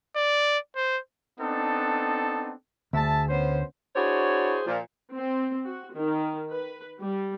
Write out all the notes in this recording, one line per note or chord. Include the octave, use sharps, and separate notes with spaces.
D5
C5
B3 C4 D4 D#4 A4
D2 G#4 E5 A5
B3 C#4 C5
D4 E4 F#4 G#4 C5 C#5
A#2 F3
C4
F#4
D#3
B4
G3